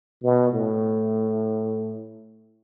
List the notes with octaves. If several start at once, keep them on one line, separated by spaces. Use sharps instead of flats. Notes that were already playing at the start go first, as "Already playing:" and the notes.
B2
A2